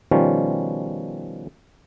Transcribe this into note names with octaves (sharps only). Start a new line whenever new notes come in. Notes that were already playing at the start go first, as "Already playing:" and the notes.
B2 D#3 F3 G3 C#4